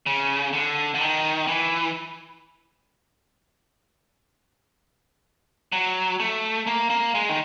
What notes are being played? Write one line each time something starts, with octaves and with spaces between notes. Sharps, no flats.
C#3
D3
D3
D#3
E3
F#3
A3
A#3
A#3
G#3
D#3